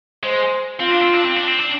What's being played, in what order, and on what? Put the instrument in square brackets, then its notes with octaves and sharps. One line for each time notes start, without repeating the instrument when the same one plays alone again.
[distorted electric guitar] G#3 [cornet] C5
[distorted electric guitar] C4 [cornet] F4
[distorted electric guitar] D4
C4
D4
C4
D4
C4
D4